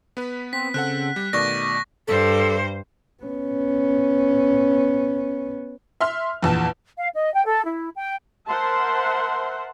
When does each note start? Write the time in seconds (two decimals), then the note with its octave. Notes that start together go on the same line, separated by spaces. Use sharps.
0.17 B3 B4 B6
0.53 C4 B6
0.74 C#3 C4 A4 F#5 F#6
1.16 G3
1.33 B2 D#3 A3 D5 C#6 A#6
2.08 G2 A4 C5
3.23 B3 C#4
6.00 E5 C6 F6
6.43 A#1 E2 A5
6.96 F5
7.13 D#5
7.33 G5
7.45 A4
7.64 E4
7.95 G5
8.47 A#4 C5 E5 F#5 A5 C6